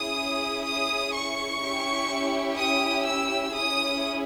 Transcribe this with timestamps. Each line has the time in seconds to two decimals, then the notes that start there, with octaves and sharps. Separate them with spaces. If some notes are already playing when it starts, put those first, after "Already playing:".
Already playing: C#4 E4 G#4 D#6
0.65 D#6
1.13 C#6
1.61 C#4 E4 G4
2.57 D#6
3.05 E6
3.53 C#4 E4 G#4 D#6